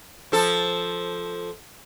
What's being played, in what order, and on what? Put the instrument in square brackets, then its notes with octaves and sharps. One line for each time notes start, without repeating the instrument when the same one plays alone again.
[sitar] F3 A4